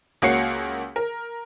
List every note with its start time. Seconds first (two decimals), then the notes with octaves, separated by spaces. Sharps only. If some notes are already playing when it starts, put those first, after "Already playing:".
0.22 C#2 A#3 F#4 C#5 C7 C#7
0.96 A#4